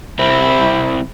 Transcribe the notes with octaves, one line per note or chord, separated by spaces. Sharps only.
C2 C4 E4